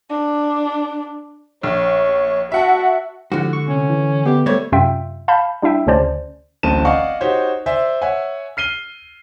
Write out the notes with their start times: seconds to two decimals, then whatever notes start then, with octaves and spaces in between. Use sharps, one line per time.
0.10 D4
1.63 A#1 C#5
2.52 F#4 E5 F#5 A5
3.32 D3 F3 G#3 E4 F#4 G4
3.53 C#6
3.68 C3 C#4
3.89 E3
4.25 B3 G4 D5 E5
4.46 G3 A3 A4 C5 C#5
4.72 F#2 C3 F4 E5 G5
5.28 F5 A5 B5 G6
5.62 G3 D4 E4 E5 G5
5.87 D2 C#3 C#4 C5 D5 A5
6.63 D1 A1 C4 A5 D#7 E7
6.85 D5 D#5 F5 F#5 G#5 C#6
7.21 D#4 F#4 G4 C5 C#5
7.66 C5 D5 E5 G#5
8.02 C#5 E5 F#5 G#5
8.57 F6 C7 D#7 G7